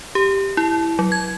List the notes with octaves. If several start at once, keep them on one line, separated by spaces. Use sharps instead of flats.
G4
E4
F#3
G#6